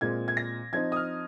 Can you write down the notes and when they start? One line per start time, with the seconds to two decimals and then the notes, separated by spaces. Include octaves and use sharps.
0.01 A#2 G#3 C4 G#6
0.28 G#6
0.37 A#6
0.72 F3 C4 D#4 G#6
0.92 D#6
0.96 F6